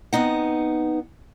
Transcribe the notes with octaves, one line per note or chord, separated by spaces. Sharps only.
B3 C4 D#4 F#5